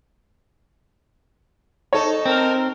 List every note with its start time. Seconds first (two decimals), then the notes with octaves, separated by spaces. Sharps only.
1.93 D#4 A4 C#5
2.26 C4 A#4